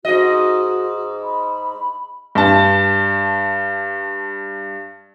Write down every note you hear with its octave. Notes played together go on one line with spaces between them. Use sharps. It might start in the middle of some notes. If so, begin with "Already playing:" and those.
G#2 F#4 D#5
B5
G2 A5